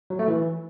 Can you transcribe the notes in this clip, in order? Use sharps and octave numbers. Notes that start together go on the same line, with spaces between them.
F#3
A3
E3